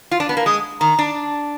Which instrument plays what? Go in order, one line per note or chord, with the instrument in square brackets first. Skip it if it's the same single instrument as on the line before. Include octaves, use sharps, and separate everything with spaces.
[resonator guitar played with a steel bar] F4
D4
B3
A#3
[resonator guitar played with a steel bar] G#3 [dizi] D#6
[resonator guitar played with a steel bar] D#3 [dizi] A#5
[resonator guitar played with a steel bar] D4